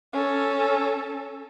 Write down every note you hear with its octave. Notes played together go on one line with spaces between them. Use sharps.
C#4 A4